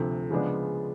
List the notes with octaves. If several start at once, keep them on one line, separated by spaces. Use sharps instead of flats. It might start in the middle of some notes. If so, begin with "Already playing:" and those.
Already playing: D2 C3 F3 A3
C#3 F3 G#3 B3 D4